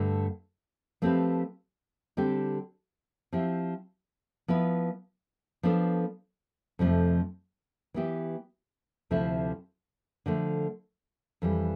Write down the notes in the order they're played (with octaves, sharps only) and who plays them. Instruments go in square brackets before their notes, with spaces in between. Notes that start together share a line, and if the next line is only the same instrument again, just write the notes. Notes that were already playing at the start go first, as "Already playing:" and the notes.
Already playing: [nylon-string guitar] G2 D3 A3
F3 A3 C4 G4 B4
D3 G3 C4 G4
F3 C4 E4 G4
F3 B3 E4 B4
F3 B3 D4 A4 C5
F2 C3 F3 A3
E3 B3 E4 G4
D2 C3 F3 A3 E4
D3 F3 A3
F2 E3 G3